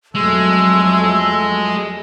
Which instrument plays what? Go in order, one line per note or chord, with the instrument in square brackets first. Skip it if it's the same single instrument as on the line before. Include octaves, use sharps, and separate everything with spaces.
[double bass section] F2 F#3 A3 [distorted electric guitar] G#3 [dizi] E6